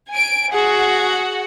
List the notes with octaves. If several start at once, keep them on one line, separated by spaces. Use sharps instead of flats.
G#5 D7
F#4 G#4 F#5